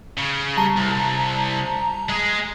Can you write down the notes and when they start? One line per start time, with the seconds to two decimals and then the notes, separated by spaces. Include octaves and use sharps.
0.17 C#3
0.57 G3 A5 A#5
0.76 C2
2.09 G#3 G#4